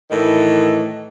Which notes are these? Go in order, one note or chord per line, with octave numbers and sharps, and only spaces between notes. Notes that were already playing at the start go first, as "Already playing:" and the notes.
A2 D#3 E3